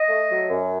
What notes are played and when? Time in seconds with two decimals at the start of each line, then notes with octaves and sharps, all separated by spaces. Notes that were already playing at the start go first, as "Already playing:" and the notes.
Already playing: D#5
0.08 A3
0.30 F#3
0.49 F#2